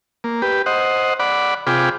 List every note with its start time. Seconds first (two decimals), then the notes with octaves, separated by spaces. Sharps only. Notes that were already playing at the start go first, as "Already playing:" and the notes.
0.24 A#3
0.42 G4 B4
0.66 C5 D#5 F#5
1.20 D5 F#5 B5
1.67 C3 F4 G#4 G5 B5 D6